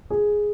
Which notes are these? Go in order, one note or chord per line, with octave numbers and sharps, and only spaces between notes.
G#4